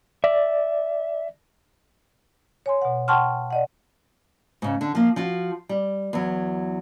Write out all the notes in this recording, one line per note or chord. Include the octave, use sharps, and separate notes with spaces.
D5 E5
C#5 G#5 C6
B2 F#5
F#5 G5 A5 C6 C#6 F6
D5 D#5 F#5
G#2 C#3
D3
F3 A#3
F3 F4 F#4
G3
E2 F#3